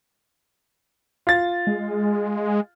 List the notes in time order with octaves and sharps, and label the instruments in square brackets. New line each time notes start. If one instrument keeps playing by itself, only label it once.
[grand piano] F4 A6
[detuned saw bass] G#3